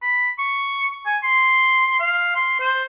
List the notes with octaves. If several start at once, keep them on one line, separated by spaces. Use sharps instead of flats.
B5
C#6
G#5
C6
F5
C6
C5